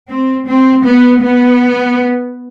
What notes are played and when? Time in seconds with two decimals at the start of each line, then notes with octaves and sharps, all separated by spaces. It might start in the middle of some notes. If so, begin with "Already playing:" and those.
0.09 C4
0.47 C4
0.85 B3
1.21 B3